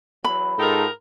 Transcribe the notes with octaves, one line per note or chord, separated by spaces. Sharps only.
E2 F#3 B5
G#2 D#4 F4 G4 A4 A#4